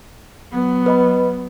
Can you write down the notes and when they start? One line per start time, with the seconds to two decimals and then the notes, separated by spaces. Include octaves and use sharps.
0.52 F#3 B3
0.86 B4 D#5 B5